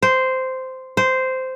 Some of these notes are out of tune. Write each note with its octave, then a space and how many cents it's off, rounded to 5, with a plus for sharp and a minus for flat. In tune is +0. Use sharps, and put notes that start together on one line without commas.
C5 -10
C5 -10